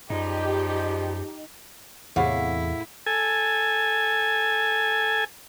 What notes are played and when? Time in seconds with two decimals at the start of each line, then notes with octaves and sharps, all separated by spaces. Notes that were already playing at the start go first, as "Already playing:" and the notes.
0.10 F#2 F3 G3 G#3 D#4 G4
2.16 E2 A2 C3 E4 G#4 F5 F#5
3.06 A4 G#5